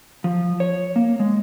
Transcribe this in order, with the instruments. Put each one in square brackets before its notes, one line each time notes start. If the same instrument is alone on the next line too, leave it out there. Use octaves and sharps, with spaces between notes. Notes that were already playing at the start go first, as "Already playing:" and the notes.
[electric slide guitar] F3
C#5
A#3
G#3